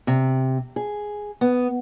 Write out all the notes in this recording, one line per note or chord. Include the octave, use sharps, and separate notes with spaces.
C3
G#4
B3